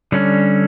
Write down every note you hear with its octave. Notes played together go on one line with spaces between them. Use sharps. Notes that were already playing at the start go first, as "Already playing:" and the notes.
D3 G3 C#4